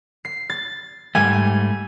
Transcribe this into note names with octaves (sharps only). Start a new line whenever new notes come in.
C7
A6
G#2 G3 A3 G#5